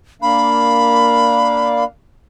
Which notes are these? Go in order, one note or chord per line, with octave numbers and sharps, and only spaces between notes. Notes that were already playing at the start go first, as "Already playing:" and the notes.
A#3 D4 F5 B5